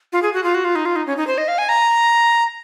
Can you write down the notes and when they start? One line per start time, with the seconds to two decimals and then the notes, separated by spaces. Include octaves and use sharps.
0.13 F4
0.23 G#4
0.34 F#4
0.44 F4
0.54 F#4
0.65 F4
0.76 D#4
0.85 F4
0.96 D#4
1.07 C#4
1.17 D#4
1.27 C5
1.38 D#5
1.48 F5
1.58 G#5
1.69 A#5